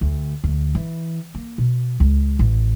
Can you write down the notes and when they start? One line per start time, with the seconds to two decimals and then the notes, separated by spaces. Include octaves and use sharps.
0.01 D2
0.44 D2
0.75 E3
1.34 A#3
1.58 B2
2.00 C#2
2.39 A1